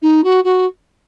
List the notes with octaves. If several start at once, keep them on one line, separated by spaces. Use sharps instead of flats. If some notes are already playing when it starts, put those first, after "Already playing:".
D#4
F#4
F#4